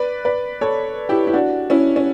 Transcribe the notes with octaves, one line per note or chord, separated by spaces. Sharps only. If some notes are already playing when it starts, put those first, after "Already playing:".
Already playing: B4 D5
B4 D5
A4 C#5
E4 G4
E4
D4 F#4
C#4 E4
C#4